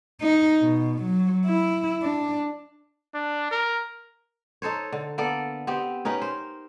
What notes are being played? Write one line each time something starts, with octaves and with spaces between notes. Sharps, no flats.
D#4
B2
F#3
E4
D4
D4
A#4
D#4 A4 C5 C#5
D3
A#3 B3 A4 D5
B3 C4 G4
C#4 D#4 A#4 B4
C5